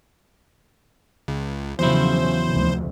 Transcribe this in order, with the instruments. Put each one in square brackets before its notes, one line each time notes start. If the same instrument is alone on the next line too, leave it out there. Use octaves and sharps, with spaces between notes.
[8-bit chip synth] C#2
[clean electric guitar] E2 F#3 E4 [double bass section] C#3 F3 [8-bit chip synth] C5
[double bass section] F1 D2